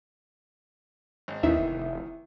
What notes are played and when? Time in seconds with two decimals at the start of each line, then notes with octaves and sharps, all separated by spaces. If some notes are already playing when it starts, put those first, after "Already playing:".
1.28 G#1
1.43 D#2 D#3 E3 B3 E5
1.59 F1